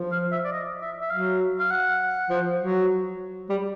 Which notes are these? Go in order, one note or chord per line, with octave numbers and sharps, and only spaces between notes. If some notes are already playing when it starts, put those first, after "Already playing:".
Already playing: F3
F5
E5
D5
D#5
E5
E5
F#3 F5
F5
F#5
F3
F#3
G3